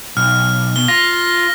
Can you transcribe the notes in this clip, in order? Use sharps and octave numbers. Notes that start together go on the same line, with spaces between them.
B1 F6
B2 G7
F4 A#6